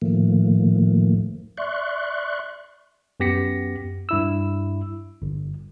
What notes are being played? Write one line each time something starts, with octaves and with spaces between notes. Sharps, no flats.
A2 D#3 F3 A3 A#3
D5 E5 C6 C#6 F#6
F#2 B3 G4 A#6 B6 C#7
G2 E4 E6
G1